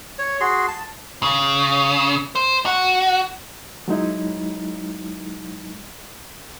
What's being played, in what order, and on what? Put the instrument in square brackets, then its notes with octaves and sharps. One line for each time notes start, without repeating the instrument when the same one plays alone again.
[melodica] C#5
F#4 G#4 C6
A5
[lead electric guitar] C#3
C5
F#4
[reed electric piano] F#3 G#3 D#4 E4